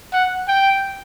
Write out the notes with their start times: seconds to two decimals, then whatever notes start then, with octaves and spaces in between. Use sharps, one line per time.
0.13 F#5
0.48 G5